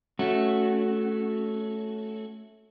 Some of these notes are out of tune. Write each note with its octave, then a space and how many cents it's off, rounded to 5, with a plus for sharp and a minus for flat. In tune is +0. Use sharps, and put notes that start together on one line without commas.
A3 -10 C#4 +0 F#4 +0